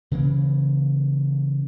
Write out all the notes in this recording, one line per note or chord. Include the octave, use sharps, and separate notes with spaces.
C#3 E3 A#3